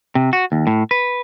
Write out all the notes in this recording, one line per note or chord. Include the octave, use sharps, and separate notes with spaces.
C3
F#4
D#2
A2
B4